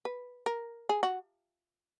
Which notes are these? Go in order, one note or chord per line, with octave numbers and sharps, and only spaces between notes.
B4
A#4
G#4
F#4